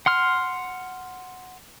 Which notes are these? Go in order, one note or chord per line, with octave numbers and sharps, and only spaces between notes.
F#5 C6 F6